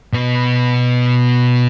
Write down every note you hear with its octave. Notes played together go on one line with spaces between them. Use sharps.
B2 B3